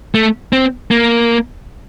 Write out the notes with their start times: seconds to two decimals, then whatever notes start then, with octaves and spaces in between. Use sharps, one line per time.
0.15 A3
0.53 C4
0.91 A#3